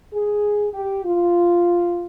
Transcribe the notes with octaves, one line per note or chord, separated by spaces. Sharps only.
G#4
G4
F4